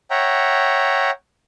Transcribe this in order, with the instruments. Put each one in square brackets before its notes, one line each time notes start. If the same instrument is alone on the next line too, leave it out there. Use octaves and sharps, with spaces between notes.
[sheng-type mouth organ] C#5 E5 F#5 G5 A#5